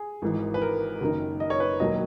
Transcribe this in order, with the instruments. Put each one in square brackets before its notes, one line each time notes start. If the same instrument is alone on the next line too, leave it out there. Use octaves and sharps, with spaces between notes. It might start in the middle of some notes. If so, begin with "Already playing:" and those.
Already playing: [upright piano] G#4
G#1 G#2 E3
B4
A#4
F#1 F#2 D#3
D#5
C#5
B4
E1 D#2 D#3 F#3 D#5